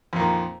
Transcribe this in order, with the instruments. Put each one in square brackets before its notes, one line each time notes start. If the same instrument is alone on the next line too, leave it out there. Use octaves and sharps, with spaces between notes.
[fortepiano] F2
A#2
D#3